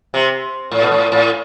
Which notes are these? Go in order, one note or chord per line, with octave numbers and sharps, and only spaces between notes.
C3
A2
B2
A2
A2